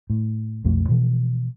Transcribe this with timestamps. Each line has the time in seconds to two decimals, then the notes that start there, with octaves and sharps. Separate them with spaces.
0.10 A2
0.64 B1 F2 F3 A3
0.88 B2 E3 F3